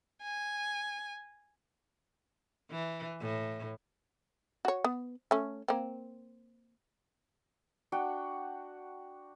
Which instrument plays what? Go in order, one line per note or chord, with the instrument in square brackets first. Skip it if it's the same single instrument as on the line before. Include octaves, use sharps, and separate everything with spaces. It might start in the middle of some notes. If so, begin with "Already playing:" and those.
[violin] G#5
[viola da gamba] E3
A2
[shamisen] F#4 C#5
B3
A3 C#4
A#3 C4
[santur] D4 F#4 F#5 G5